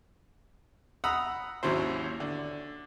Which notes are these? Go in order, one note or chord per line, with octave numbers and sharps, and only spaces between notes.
F#5 A#5 B5 D#6 E6
G#1 D#2 F#3 C#4 E4 C5
D3